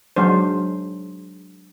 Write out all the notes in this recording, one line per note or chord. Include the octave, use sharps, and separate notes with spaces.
F#3 G#3 D4 C5